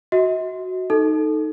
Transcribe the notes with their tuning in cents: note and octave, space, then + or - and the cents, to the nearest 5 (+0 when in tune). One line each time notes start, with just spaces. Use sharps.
F#4 +0 D#5 +45
D#4 +0 A4 +0